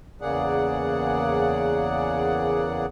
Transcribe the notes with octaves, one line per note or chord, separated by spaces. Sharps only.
E2 C#3 A#3 G#4 D5 F#5